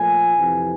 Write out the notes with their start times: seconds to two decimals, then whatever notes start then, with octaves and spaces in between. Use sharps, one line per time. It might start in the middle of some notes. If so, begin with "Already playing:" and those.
Already playing: A#2 F3 A3 G#5
0.36 F2 C3 E3